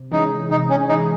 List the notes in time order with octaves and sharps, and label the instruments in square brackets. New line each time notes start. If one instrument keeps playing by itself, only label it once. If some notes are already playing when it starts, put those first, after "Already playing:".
Already playing: [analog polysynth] C3
[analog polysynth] E3 G#3 C#4 G#4 [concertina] D#4
[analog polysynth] C3 [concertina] D#4
[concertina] C#4
[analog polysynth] E3 G#3 C#4 G#4 [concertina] D#4